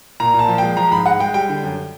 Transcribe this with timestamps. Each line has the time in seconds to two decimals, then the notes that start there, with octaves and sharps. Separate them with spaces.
0.20 A#2 A#5
0.34 A#2
0.39 A5
0.48 F3
0.58 G#3 G5
0.77 F3 A#5
0.92 G#2 B5
1.06 G#3 F#5
1.20 G#3 G5
1.34 G3 G5
1.49 D3
1.63 F#2